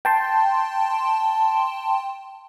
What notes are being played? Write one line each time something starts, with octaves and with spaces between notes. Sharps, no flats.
G5 A5 C6